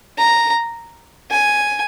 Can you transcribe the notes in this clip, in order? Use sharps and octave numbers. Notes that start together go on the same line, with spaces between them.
A#5
G#5